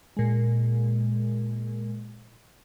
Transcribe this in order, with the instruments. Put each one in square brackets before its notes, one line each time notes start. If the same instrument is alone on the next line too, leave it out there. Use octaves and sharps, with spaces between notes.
[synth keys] A#2 G#3